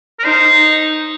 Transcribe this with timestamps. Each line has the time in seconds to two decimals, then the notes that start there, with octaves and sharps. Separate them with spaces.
0.19 A#4
0.24 D#4 C5